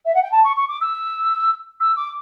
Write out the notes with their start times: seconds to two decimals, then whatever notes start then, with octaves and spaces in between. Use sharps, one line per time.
0.05 E5
0.14 F#5
0.22 G5
0.31 A5
0.44 C#6
0.56 C#6
0.68 D6
0.81 E6
1.80 E6
1.97 D6